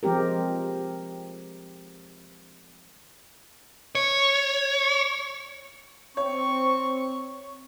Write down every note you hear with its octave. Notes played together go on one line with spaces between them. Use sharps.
F3 G#3 C4 G4 A#4
C#5
C4 C#5 C#6